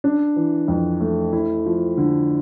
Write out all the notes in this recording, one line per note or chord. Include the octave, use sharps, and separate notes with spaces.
D4
E3
F2
A3
E4
F3
D3